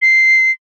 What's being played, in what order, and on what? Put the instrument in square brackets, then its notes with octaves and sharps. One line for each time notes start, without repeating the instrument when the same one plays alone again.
[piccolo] C7